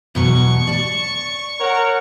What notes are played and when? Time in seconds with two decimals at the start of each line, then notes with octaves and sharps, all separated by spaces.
0.15 E2 B2 F#3 C#6
0.67 D5 A5
1.60 A#4 C#5 F#5